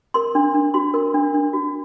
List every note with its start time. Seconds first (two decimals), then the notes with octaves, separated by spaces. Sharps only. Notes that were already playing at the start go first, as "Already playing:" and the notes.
0.14 A#4 C6
0.35 D4
0.54 D4
0.74 F#4 C6
0.94 A#4
1.14 D4
1.34 D4
1.53 F#4